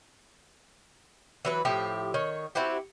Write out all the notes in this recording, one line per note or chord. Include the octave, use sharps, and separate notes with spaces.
E3 F#3 B4
A2 F3 G4 E5
D#3 C#5
C4 E4 F#4 G4